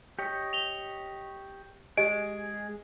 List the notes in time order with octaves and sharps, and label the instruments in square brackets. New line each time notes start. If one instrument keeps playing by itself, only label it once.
[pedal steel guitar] G4 C#5 D#5
[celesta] F7 G7
[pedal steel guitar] G#3 G#4 [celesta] G4 D#5 D7